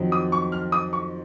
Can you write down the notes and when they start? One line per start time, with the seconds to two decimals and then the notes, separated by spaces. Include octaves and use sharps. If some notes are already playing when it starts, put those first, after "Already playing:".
Already playing: F2 D#3 F#3
0.12 D#6
0.32 C#6
0.52 F6
0.72 D#6
0.93 C#6